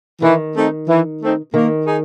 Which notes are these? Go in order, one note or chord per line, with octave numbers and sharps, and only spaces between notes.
D#3 E3
A3 C4 D#4
E3
A3 C4 D#4
D#3 A#3
D#4 G#4